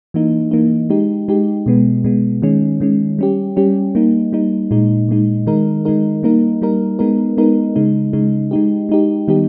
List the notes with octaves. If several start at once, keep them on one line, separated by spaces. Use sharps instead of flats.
E3 A#3 D#4
E3 A#3 D#4
G#3 D#4 G4
G#3 D#4 G4
B2 G#3 B3
B2 G#3 B3
D#3 G#3 C#4
D#3 G#3 C#4
G3 C#4 G4
G3 C#4 G4
G3 A#3 D#4
G3 A#3 D#4
A#2 G#3 D#4
A#2 G#3 D#4
D#3 G#3 D#4 A#4
D#3 G#3 D#4 A#4
G3 A#3 D#4 A#4
G3 A#3 D#4 A#4
G#3 B3 D#4 A#4
G#3 B3 D#4 A#4
C#3 G#3 D#4
C#3 G#3 D#4
G#3 D#4 G4
G#3 D#4 G4
D#3 G3 B3 D#4 G4